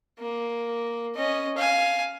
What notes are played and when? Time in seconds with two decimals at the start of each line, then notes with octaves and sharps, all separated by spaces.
0.19 A#3
1.16 C#4 D#5
1.57 F5 G#5